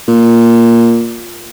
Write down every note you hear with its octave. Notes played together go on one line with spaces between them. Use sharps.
A#2